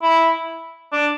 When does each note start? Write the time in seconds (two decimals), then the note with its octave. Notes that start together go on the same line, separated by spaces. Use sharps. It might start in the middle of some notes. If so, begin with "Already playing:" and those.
0.02 E4
0.92 D4